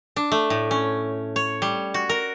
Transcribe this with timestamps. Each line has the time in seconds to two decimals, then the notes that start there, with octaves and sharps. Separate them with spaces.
0.16 D4
0.32 A3
0.50 A2
0.71 C#4
1.36 C#5
1.62 G3
1.94 F#4
2.09 A#4